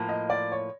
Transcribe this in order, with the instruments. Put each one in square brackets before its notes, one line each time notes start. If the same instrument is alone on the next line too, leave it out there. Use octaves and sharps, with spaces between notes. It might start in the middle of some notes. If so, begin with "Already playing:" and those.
Already playing: [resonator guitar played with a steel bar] A2 F3 A#3
[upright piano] D#5
D5
C#5